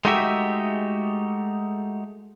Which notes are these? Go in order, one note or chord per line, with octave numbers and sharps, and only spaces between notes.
G#3 A3 D#4 F#4 G4 E5